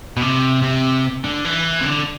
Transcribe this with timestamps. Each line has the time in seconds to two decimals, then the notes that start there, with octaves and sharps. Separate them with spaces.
0.17 B2
0.22 C3
0.63 C3
1.24 D3
1.45 E3
1.81 C3
1.86 D3